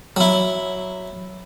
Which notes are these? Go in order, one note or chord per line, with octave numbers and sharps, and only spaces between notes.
F#3 E4